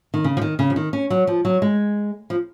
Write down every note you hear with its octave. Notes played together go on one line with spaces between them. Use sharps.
D#3
C#3
F3
D#3
C#3
F3
D#3
C#4
F#3
F3
F#3
G#3
F3